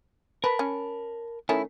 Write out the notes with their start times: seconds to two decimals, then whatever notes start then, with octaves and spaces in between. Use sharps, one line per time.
0.44 A#4 B4 A5 B5
0.59 C#4
1.49 D#3 A3 C#4 E4